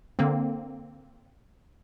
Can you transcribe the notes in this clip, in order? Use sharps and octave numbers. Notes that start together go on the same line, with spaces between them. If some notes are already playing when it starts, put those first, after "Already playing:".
D3 A#3 C4